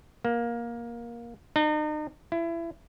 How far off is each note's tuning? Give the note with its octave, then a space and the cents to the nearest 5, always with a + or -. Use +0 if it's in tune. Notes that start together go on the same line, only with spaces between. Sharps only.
A#3 +15
D#4 -40
E4 +25